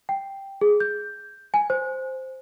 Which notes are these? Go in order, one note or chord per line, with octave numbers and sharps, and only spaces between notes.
G5
G#4
G6
G#5
C5